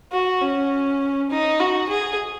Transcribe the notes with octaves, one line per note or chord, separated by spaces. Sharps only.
F#4
C#4
D#4
F#4
G#4